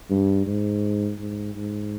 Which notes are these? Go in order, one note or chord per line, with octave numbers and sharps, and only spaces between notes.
G2
G#2
G#2
G#2